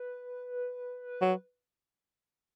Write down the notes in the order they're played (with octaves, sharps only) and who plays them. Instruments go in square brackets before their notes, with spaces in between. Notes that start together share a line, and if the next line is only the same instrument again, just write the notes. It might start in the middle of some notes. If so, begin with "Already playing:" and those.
Already playing: [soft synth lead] B4
[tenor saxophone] F#3